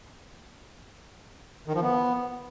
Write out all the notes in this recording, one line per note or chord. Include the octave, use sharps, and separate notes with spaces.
D#3
F3
B3